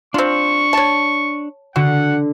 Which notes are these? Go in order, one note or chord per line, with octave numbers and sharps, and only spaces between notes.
C4 D4 F4 C#6
C#5 A5
D3 F#4 F#5